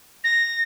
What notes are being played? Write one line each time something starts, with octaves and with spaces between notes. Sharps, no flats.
A#6